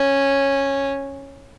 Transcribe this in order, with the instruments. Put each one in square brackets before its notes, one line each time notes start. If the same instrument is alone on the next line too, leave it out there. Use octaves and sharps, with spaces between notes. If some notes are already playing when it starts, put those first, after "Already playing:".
Already playing: [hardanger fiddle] C#4